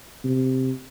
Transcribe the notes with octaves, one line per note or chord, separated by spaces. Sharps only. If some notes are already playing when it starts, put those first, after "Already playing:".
C3